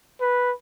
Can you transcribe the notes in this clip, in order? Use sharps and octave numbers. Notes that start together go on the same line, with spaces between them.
B4